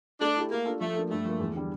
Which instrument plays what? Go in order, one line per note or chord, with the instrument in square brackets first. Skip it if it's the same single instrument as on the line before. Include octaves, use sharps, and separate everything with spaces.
[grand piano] A3 [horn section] D4
[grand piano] E4 G4
[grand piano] A3 [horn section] A#3
[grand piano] D4 F4 A4
[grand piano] F3 [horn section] A3
[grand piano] A#3 D4 A4
[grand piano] G2 [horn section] A3
[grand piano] F3 A#3
E2
D3 G3